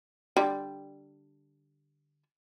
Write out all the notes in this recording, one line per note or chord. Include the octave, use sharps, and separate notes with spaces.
D3 G3